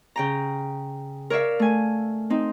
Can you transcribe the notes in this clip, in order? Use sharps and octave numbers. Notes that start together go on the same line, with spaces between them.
C#3 G5 A#5
A#4 C#5 D5 E5 F5
A3 G#5
C4 D#4